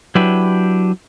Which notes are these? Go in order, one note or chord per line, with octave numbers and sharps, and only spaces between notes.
F#3 D4 E4 G4 B4